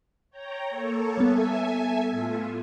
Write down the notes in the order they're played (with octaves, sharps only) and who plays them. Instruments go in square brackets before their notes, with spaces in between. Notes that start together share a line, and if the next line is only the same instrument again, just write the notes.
[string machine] C#5 G5 A#5
A#3 A4 C#5
[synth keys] G3 B3 [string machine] A4 E5 G#5
[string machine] A2 F4